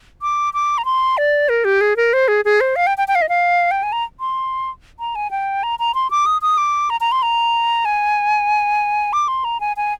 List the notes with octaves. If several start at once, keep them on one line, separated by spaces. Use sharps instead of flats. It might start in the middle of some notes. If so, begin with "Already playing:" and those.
D6
D6
A#5
C6
D5
A#4
G4
G#4
A#4
C5
G#4
G#4
C5
F5
G5
G5
G5
F5
D#5
F5
G5
G#5
A#5
C6
A#5
G#5
G5
A#5
A#5
C6
D6
D#6
D#6
D6
A#5
A#5
C6
A#5
G#5
D6
C6
A#5
G#5
G#5